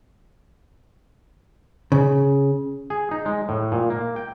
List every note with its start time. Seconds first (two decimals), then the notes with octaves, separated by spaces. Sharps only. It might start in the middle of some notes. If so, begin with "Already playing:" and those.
1.92 C#3
2.90 G#4
3.11 D#4
3.26 G#3
3.49 A2
3.72 A#2
3.90 A#3
4.16 G5